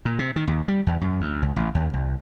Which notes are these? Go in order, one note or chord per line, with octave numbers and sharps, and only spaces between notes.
A#2
C3
D#3
D#2
G3
E2
F#2
D2
C#2
A1
D#2
C2